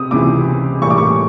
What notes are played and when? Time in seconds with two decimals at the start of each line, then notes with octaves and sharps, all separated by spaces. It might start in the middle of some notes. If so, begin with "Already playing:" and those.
Already playing: C3 D#6
0.11 C#2 C3 E3 D6
0.82 A2 E3 G3 A#3 C#6
0.90 D6
0.98 C#6